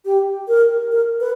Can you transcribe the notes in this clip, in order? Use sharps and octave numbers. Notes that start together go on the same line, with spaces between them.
G4
A#4
A#4
B4